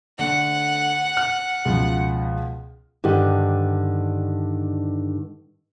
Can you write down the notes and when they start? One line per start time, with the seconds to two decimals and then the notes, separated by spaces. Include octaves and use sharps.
0.19 D3 A3 F#5
1.17 F6
1.65 C#2 B2 F3
3.04 G2 D3 D#3 G4